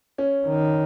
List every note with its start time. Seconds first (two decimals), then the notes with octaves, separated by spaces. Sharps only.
0.18 C#4
0.47 D#3